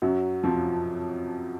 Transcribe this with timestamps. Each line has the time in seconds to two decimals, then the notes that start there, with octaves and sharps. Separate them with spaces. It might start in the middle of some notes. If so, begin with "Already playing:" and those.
0.02 F#2 F#3
0.43 F2 F3